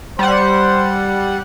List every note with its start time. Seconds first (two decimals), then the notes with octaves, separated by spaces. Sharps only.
0.19 G3 C5 F#5